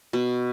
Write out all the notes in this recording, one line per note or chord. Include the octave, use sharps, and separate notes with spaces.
B2